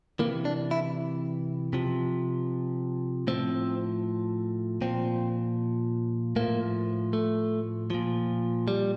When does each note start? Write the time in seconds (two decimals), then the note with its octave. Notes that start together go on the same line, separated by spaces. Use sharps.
0.19 C3 E3 A#3
0.45 D4
0.71 E4
1.73 C3 F3
3.27 A2 F3 C4
4.81 A#2 F3 C4
6.36 A2 F3 A#3
7.13 A3
7.90 A#2 F3
8.68 G3